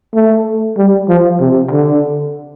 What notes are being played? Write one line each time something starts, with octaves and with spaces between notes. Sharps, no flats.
A3
G3
F3
C3
D3